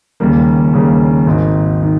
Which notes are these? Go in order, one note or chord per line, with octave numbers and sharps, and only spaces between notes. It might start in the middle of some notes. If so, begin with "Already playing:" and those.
D#2 C#3 G3 A#3
D#2 C#3 G3 A#3
G#1 G#2 D#3
D#3